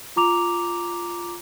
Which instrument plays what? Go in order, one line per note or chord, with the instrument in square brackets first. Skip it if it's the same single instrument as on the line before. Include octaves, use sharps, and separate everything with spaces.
[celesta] F4 A#5 D6 F7